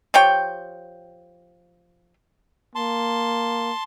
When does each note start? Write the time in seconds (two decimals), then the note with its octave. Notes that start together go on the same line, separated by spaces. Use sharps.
0.14 F3 G4 C#5 G5
2.75 A#3 A5 C6